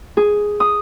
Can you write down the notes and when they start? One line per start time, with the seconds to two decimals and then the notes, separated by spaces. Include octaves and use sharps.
0.17 G#4
0.60 D#6